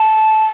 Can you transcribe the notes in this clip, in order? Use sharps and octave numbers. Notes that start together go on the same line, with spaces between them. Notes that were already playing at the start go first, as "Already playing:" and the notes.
Already playing: A5